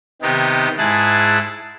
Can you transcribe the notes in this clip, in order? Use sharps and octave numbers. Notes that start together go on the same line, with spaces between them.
C3 D#3 B3 D#4 G4
G#2 E4 G#4 A5 F#6